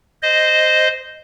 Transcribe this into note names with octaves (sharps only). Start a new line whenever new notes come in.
C5 D#5